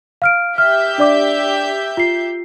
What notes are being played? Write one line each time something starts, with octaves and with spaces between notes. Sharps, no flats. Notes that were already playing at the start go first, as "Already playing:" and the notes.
F5 F6 D7
G4 E5 F6 G6
D4 D5 D6
F4 C7